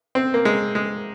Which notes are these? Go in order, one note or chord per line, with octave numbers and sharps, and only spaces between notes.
C4
A#3
G#3
G#3